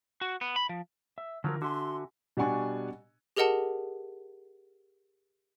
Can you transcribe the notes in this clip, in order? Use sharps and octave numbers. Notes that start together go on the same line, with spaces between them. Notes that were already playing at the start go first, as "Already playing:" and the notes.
F#4
B3
B5
F3
E5
D3 F3 F#3 F4 A#4
D3 F#4 E5 G#5 C6
B2 G3 D4 F#5 G#5 C#6
G4 G#4 A#4 D#5 F#5 A5